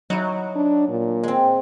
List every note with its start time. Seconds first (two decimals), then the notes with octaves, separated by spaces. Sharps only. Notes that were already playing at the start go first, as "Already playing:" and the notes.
0.10 F#3 D#4 E4
0.55 D4
0.88 A#2
1.23 G#3 C4